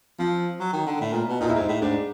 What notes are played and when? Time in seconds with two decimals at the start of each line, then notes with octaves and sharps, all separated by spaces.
0.19 F3 C4
0.60 F#3
0.73 D#3
0.87 D3
1.01 A2
1.13 A#2
1.28 B2
1.41 A#2 D#4
1.50 E4
1.55 G#2 D#4
1.68 A2
1.82 G#2 D4